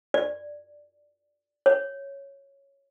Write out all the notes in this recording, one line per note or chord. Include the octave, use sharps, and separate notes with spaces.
D5
C#5